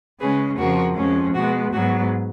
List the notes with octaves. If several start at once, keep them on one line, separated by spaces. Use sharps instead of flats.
C#3 G#3 C#4 G#4 B4
F2 C#3 F3 F#4 A#4
F2 F3 G#3 C#4
B2 G#3 B3 F#4
G#2 F#3 B3 F#4